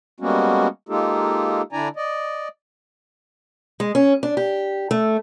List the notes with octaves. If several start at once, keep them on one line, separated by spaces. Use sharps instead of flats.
G3 G#3 A#3 B3 C#4 F#4
G#3 A#3 D#4 F4 G4 A4
D3 D4 E4 D5 G#5 A#5
D5 D#5
G#3
C#4
D4
G4
A3